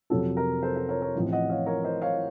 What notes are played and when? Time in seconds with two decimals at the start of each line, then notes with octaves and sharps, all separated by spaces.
0.10 F2 C3 F#3 A4
0.37 A#4
0.62 A4 C5
0.76 A4 C5
0.89 A#4 C#5
1.02 A#4 C#5
1.15 A1 A2 F3 C4
1.32 D#5 F#5
1.50 C#5 F5
1.66 A#4 C#5
1.84 C5 D#5
2.02 C#5 F5